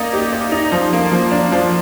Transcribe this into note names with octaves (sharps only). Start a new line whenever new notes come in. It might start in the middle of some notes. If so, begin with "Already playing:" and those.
Already playing: A#3 D#4 D5
G4
D5
D#4
F3
A#3
F3
D4
F3